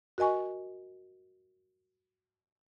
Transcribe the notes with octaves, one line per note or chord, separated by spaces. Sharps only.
F#4 A#4 D#5 G#5 C#6